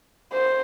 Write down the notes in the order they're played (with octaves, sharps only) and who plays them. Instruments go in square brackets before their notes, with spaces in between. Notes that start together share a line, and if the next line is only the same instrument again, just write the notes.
[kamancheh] C5